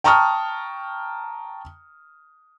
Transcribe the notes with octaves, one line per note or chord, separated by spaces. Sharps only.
G5 A5 A#5 C#6 D#6 F6